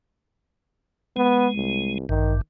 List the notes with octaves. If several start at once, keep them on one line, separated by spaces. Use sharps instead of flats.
G#3 B3
C2
A1 G2 D#3